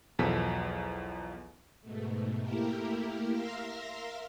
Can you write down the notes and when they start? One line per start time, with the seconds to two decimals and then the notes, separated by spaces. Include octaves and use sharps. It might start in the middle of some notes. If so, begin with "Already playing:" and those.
0.19 B1 E2 B2 F3 A4 B6
1.82 G#2 B2 A3
2.41 A3 A#3 E4 G4 A#4
3.30 A#4 E5 F5 C6 A#6